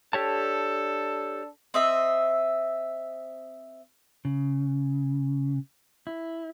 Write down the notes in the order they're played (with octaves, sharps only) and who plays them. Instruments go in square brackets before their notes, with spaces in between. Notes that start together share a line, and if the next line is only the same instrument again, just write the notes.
[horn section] D4 A4 [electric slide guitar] G4 C#5 A5
[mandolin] C4 D#5 E5
[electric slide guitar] C#3
E4